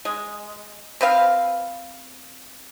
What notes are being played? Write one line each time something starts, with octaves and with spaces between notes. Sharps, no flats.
G#3
C4 B4 F5